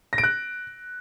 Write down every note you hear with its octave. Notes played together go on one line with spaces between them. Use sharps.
A#6
D7
F#6